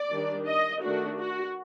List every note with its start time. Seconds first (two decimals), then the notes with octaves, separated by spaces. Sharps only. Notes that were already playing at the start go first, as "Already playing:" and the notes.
Already playing: D5
0.13 D#3 G3 D4
0.48 D#5
0.84 D#3 A3 D4 F#4
1.20 F#4